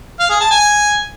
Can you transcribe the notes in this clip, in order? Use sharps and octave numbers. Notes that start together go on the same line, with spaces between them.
F5
G#4
A5
G#5